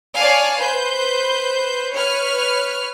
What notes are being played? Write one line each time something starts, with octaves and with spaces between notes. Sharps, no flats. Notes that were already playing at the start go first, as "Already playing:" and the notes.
C#5 D5 F5 G#5 A5
B4 C5 G6
B4 C#5 F6